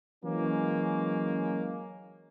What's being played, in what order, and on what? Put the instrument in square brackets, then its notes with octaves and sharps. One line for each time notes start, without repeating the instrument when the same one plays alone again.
[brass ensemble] E3 F#3 G#3 A#3 C#4